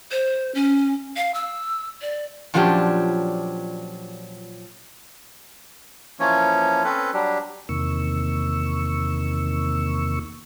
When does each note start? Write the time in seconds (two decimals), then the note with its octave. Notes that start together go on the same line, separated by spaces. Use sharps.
0.11 C5
0.55 C#4
1.17 F5
1.34 E6
2.01 D5
2.54 A#2 F3 F#3 C#4 D4 G4
6.20 E3 F3 A#3 C#4 C#5
6.84 C4 C#4 A4 B4
7.14 F#3 G3 D4 G4
7.69 E2 C3 D#3 A#3 C#6 E6